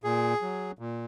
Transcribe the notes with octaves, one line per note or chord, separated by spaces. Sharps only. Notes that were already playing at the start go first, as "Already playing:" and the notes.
A#2 G#4
F#3
A#2